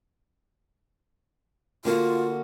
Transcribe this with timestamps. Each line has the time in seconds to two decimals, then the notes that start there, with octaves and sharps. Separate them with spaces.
1.85 D3 A#3 F4 F#4